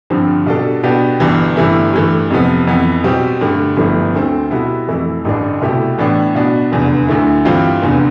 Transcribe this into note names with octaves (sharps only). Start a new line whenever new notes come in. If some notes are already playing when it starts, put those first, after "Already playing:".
G2 D3 F3 C4
B2 G3 D4 A4
B2 B3 D4 G4
G1 G2 E3
G1 G2 E3 A3 E4
G2 E3 A3
F2 C3 F3 B3
F2 E3 B3
B2 G3 C4 G4
G2 D3 A3
G1 G2 F3 A3 E4
D2 D3 A3 C4
B2 G3 B3 E4
F2 E3 A3 E4
A1 G2 D3 A3 D4
C2 B2 A3 E4 G4
A2 E3 B3 D4
B2 B3 D4
F1 E2 D3
D2 D3 A3 E4
G2 E3 G3 C4 F4
F1 E2 D3